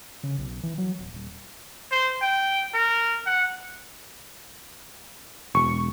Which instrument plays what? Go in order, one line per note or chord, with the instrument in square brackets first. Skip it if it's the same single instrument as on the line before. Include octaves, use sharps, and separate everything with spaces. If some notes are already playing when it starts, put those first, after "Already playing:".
[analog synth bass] C#3
B1
E3
F#3
D1
D#1
[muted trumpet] C5
G5
A#4
F#5
[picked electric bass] E1 [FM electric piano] C#6